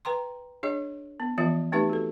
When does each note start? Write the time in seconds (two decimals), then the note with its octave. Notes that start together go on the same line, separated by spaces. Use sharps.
0.05 B4 G5 A#5 C6
0.63 D4 G#4 C#5 D#5
1.20 B3
1.38 E3 F3 B3 F4 D#5 E5
1.72 A3 C4 D#4 G4 B4 E5
1.90 F#4 A4